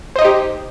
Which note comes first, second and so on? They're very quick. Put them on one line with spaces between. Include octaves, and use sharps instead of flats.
C5 D#5 D#4 G4